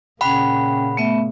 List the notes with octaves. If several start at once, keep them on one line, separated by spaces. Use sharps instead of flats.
A#2 C#3 C#4 F#5 G5 B5
A3 B3 E5